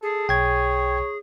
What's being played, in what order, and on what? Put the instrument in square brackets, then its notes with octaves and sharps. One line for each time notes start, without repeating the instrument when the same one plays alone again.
[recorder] G#4 [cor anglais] A4
[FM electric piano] B1 [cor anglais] C#5 [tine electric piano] G5 G#6